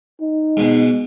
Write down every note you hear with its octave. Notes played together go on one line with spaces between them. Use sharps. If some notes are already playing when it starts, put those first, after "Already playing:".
D#4
G#2 B2